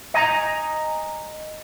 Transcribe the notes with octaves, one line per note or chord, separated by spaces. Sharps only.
D#5 G#5 A#5